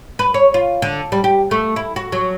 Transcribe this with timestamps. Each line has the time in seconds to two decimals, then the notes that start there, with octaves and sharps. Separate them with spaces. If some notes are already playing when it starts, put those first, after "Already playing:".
0.19 B4
0.34 C#5
0.54 F4
0.82 D3
1.12 G3
1.24 G4
1.51 A3
1.76 E4
1.96 F#4
2.12 F#3